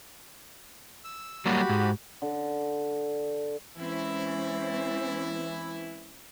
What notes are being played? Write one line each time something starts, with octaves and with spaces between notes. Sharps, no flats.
E6
F#3 G3 A#3 F#4 G4 B5
G#2
D3
E3 G#3 C4 C#4 E4